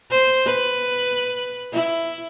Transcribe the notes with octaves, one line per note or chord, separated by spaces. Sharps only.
C5
B4
E4